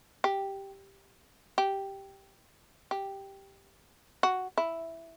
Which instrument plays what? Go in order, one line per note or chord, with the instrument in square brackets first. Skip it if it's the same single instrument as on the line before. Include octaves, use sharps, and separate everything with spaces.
[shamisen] G4
G4
G4
F#4
E4